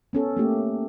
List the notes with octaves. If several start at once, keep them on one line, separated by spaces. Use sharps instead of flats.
B3 C#4 A4
A3 A#3 G4